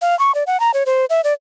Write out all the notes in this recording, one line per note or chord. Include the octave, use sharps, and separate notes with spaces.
F5
C#6
D5
F#5
A#5
C#5
C5
E5
D5